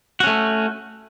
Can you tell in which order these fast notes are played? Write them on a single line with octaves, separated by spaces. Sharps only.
F#4 C#4 A3